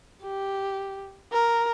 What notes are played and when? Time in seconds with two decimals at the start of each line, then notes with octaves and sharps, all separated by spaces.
0.24 G4
1.32 A#4